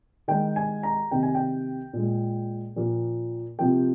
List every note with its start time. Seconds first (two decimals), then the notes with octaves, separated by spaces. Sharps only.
0.28 D#3 G#3 G5
0.56 G#5
0.83 A#5
1.11 C3 D#3 A#3 G5
1.23 G#5
1.35 G5
1.93 A#2 G#3
2.76 A#2 F3 A#3
3.59 C3 F3 A#3 G5